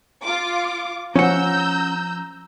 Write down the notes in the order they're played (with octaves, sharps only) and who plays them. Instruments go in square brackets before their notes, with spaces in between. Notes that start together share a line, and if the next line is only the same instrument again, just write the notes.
[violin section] F4 D6
[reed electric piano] F3 [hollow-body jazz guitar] C#4 F#5 [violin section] A#5 E6 G6